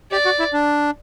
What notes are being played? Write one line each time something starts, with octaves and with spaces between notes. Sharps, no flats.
G4 D5
F#4
E4
D4